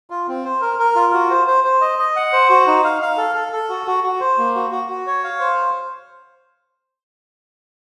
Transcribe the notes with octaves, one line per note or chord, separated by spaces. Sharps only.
F4
C4
C5
A#4
A#4
F4
F#4
C5
C5
C5
D#5
D#5
F#5
C5
F#4
D#4
F5
F5
A4
A4
A4
F#4
F#4
F#4
C5
A#3
F#4
F#4
F#4
C#5
F5
C5